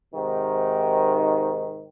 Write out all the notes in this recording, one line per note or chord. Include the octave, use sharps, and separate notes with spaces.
G#2 C3 D#3